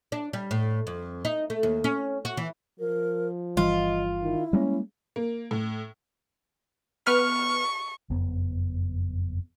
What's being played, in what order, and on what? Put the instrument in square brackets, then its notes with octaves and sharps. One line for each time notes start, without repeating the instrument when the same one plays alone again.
[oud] D4
G3
A2
F2
D#4
A3
D#2
C#4
F#4
E3
[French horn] F3 [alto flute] A#4
[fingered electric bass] G1 E3 G3 [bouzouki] F4 [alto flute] D#5
[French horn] D#3 [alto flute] E4
[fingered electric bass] G3 G#3 A#3 [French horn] C#4
[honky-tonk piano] A#3
A2
[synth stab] B3 B4 F6 [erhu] C#6
[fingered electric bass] F#1 F2 B3